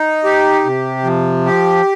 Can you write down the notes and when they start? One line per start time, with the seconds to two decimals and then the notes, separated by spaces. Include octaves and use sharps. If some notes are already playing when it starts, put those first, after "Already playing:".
Already playing: D#4
0.24 G4
0.64 C3
1.04 F3
1.45 G4